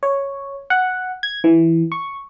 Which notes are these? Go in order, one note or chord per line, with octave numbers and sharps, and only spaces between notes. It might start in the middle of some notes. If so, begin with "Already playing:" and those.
C#5
F#5
G#6
E3
C#6